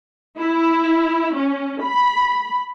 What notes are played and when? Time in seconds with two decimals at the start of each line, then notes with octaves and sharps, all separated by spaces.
0.38 E4
1.35 C#4
1.83 B5